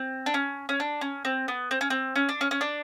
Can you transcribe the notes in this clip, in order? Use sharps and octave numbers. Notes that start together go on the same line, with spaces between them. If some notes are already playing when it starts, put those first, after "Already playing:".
Already playing: C4
D4
C#4
C#4
D4
C#4
C4
B3
C4
C#4
C4
C#4
D4
C#4
C#4
D4